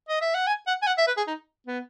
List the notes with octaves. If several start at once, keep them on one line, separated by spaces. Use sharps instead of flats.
D#5
E5
F#5
G#5
F#5
G#5
F#5
E5
B4
G#4
D#4
B3